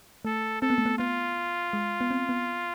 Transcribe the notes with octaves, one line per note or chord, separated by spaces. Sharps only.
A3 A4
C4 A4
B3
A3
B3
B3 F4
G#3
B3
C4
B3